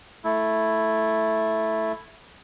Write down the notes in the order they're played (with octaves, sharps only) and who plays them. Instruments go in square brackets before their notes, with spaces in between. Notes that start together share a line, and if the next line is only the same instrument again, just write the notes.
[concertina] A3 E4